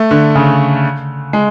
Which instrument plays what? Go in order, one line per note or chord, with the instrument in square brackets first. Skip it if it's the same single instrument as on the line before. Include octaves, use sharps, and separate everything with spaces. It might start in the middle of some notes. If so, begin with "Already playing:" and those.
Already playing: [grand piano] A3
D3
C#3
G#3